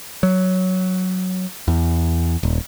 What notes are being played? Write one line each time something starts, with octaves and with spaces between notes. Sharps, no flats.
F#3
E2
D#1